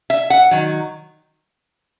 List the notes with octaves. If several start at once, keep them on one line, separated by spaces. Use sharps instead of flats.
E5
F#5
D#3 F#3